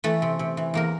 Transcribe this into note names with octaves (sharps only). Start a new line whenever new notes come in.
E3 A3 A4
C3
C3
E3
E2 A#3 A#4